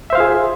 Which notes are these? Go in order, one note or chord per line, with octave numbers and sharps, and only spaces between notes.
F4 G#4 C5 E5 F5